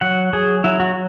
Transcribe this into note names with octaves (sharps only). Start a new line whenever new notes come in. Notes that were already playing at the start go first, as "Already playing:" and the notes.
F#3 F#5
F#3 G#4
F#3 E4
F#4